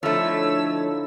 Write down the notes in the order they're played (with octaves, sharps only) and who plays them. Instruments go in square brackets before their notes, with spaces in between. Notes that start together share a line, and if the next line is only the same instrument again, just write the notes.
[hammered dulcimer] D3 D#4 E4 [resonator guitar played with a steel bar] F3 A3 [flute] C#5 [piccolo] E6